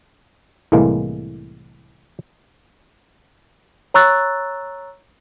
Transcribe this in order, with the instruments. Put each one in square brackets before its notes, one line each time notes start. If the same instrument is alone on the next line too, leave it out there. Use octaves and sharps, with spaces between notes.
[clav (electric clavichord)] C2 A2 E3 G#3 A#3
[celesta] C#5 A#5 C#6 E6 F#6 A6